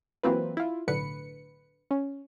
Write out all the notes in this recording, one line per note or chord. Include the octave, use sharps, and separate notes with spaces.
E3 F#3 A#3 C4 F4 B4
E4 F4
B1 A2 D3 B4 C#7
C#4